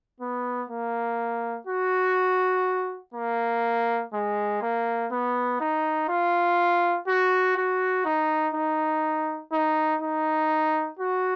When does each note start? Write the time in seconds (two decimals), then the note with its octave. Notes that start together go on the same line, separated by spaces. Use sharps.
0.20 B3
0.70 A#3
1.67 F#4
3.14 A#3
4.14 G#3
4.62 A#3
5.11 B3
5.61 D#4
6.09 F4
7.08 F#4
7.57 F#4
8.05 D#4
8.55 D#4
9.52 D#4
10.02 D#4
10.99 F#4